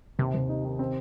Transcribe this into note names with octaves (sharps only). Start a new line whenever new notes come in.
D#2 C3
D#2
D#4
D#3
C4